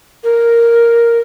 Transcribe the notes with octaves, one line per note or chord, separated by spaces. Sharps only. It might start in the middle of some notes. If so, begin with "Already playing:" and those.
A#4